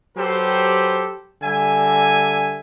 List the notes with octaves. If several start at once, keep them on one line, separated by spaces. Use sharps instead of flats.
F#3 G4 A4 B4 C5
D3 G3 E5 G#5